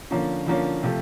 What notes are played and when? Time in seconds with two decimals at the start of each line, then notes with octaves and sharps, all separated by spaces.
0.11 D3 F3 A#3 C#4
0.46 D3 F3 A#3 C#4
0.83 C3 F3 A3